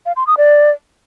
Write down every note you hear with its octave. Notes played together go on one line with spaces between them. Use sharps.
F5
C6
D#6
D5